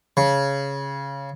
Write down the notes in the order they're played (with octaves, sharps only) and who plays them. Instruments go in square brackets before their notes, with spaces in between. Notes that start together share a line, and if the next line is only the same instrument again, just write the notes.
[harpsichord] C#3